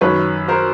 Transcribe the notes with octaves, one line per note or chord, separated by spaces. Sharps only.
F#2 D#3 B4 C#5
A#4 C5